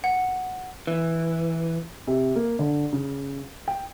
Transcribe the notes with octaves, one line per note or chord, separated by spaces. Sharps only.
F#5
E3
C3
A#3
D3
C#3
G5